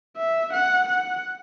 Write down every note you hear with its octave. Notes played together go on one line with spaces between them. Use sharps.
E5
F#5
F#5